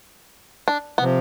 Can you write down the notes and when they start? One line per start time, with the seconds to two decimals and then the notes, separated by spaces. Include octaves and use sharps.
0.68 D4
0.98 C3 F3 B3